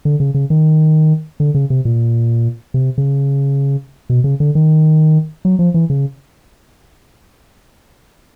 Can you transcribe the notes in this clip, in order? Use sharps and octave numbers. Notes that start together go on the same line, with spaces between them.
D3
C#3
C#3
D#3
D3
C#3
C3
A#2
C3
C#3
B2
C#3
D3
D#3
F#3
F3
E3
C#3